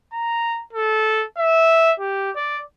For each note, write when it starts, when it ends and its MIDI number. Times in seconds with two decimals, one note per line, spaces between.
0.13 0.62 82
0.73 1.25 69
1.37 1.92 76
2.00 2.31 67
2.36 2.61 74